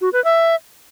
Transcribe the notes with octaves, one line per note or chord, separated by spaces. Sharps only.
F#4
B4
E5